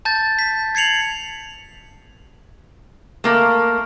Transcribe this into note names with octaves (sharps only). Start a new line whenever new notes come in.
A5 G6 A6
B6
G#6 C7 C#7 F7 F#7
A3 A#3